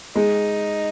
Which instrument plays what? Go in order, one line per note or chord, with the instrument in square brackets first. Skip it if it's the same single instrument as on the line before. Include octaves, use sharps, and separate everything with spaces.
[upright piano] G#3 [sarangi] D#4